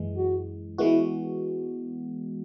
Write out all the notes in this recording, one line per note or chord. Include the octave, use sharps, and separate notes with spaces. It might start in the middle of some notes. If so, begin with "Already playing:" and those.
Already playing: F#2 E3 G#3
F#4
E3 G#3 B3 E4 F#4